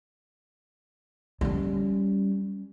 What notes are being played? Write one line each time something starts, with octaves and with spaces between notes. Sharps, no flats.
G3 C#4